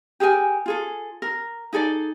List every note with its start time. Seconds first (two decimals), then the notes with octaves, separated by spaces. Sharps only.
0.20 G4 G#4 A#4 G#5
0.66 F4 G#4 A4
1.22 A#4
1.73 D#4 G#4 A4 D5